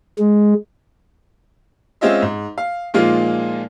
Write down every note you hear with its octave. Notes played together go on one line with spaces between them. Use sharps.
G#3
G#3 C4 C#4 F4 D#5 E5
G#2
F5
A#2 F3 G#3 A#3 D#4 F4